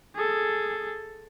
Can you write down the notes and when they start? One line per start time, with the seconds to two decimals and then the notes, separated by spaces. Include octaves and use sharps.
0.16 G#4 A4